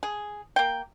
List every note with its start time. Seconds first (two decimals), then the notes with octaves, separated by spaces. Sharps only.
0.03 G#4
0.56 A#3 G5